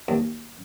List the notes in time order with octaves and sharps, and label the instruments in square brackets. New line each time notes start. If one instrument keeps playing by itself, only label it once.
[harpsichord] D#2